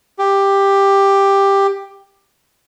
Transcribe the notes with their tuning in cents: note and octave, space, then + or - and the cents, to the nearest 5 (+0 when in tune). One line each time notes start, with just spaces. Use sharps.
G4 +10